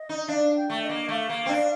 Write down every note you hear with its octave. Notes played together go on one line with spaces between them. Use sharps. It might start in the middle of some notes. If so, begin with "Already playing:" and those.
Already playing: D#5
D#4
D4 F5
G5
A3
D#5
A#3
A3 F5
A#3
C4
D4